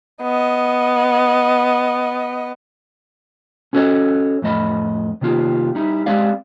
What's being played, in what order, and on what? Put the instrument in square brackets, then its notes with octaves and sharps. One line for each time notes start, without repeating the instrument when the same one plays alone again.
[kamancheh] B3 D#5
[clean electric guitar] C#4 F#4 A4 A#4 C#5 D#5
F2 A2 A3 D#5 B5
C3 D#3 A#3 F4 G4
G3 D#4 E4
G#3 C4 G4 D5 F5